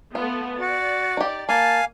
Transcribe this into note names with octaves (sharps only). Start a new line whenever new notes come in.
A3 B3 F4
F#4 D5 A6
D#4 G4
A#3 F5 G#5 A5